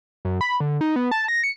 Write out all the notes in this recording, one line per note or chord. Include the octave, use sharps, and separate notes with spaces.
F#2
B5
D3
D#4
B3
A5
A#6
C#7